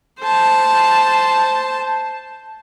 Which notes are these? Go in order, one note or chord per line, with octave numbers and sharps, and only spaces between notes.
C5 A5